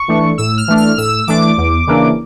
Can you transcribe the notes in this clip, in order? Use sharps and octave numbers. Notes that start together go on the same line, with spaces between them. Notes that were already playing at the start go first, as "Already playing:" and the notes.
Already playing: C#6
E3 A3 D4
A2 E6
F6
E3 A3 D4
F6
A2 E6
E3 A3 D4 D6
E2
C#3 E3 A#3 D4